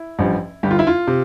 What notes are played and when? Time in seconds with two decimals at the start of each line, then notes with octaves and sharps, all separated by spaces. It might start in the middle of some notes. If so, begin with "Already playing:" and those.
Already playing: E4
0.19 A1 G2 F3
0.63 G1 G2 D3 G4
0.71 F4
0.79 E4
0.87 F4
1.07 C3